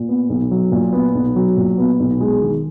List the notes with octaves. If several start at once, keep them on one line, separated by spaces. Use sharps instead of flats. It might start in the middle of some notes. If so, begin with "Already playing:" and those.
Already playing: A#2
B3
B1
F#3
A#2
B3
B1
F#3
A#2
B3
B1
G#3
D#3